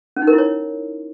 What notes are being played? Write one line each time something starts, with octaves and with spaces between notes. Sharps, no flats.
C#4
D#4
A#4
E4
C#5